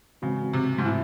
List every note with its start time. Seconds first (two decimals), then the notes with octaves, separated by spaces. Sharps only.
0.22 C#3 E3 G#3 C4 F#4
0.53 C3
0.78 G#2
0.85 A2